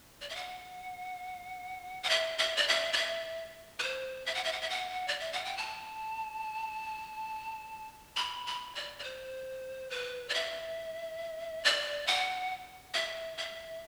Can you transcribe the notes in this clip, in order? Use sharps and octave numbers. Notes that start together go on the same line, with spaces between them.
D5
E5
F#5
F#5
E5
E5
D5
E5
D5
E5
B4
C5
E5
F#5
E5
F#5
E5
F#5
D5
E5
F#5
G5
A5
B5
B5
D5
D5
C5
B4
D5
E5
D5
F#5
E5
E5